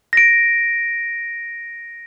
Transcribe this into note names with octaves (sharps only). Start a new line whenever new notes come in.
A#6 D7